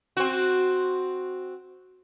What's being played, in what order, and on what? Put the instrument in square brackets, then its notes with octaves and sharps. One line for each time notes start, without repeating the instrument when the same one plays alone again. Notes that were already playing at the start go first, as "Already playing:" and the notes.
[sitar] C4 F#4